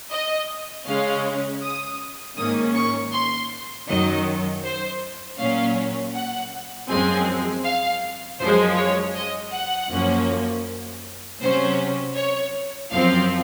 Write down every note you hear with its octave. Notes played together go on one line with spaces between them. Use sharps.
D#5
C#3 G#3 C#4 F5
D#6
G#2 D#3 A#3 C#4 D#6
C#6
C6
F#2 D#3 F#3 D#5
C5
A#2 F#3 C#4 F5
F#5
F#2 F3 G#3 C4 G#5
F5
F#2 F3 G#3 C5
C#5
D#5
F#5
F#2 F3 A#3 C#4
C3 F#3 C#4 C5
C#5
F#2 F3 C4 F5